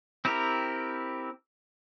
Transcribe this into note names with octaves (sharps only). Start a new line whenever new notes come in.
C4 E4 G4 A#4